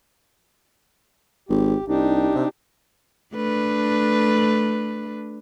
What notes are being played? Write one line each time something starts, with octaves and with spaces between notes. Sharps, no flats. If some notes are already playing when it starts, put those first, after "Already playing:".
G#1 G4
C2 D4 D#4 G4
C3
A3 D4 B4